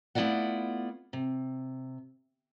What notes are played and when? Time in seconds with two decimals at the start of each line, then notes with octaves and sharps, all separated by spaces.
0.15 A3 B3 E4 F4 D5 F#5
1.13 C3